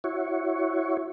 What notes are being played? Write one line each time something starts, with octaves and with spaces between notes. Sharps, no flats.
E4 F#4 C#5